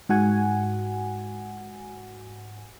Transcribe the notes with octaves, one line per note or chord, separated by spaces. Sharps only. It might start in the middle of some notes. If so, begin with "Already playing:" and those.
G#2 F#4 F#5 G#5